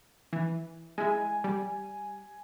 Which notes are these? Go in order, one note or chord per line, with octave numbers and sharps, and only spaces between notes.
E3
G#3 E4 G#5
G3